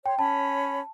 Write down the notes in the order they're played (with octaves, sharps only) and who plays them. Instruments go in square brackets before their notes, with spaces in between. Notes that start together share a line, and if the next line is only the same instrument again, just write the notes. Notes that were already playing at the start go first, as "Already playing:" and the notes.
[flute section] C#5 C6 [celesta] G5
[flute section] C#4 C#5 B5 [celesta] A5